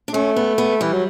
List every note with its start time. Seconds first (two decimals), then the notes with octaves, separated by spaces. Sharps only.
0.08 D4
0.13 A3 C#4
0.36 B3
0.58 B3
0.81 E3 G3
0.93 F#3